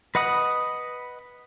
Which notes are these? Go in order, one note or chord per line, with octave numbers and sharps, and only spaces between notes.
B4 D#5 F#5 B5 D#6